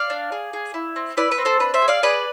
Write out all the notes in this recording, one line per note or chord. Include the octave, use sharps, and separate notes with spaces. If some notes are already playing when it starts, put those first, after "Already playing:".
Already playing: D5 F5
D4
G#4
G#4
E4
C4
E4 B4 D5
B4
C4
A4 C5
D4 B4
C5 E5
G#4
D5 F5
G#4 B4 D5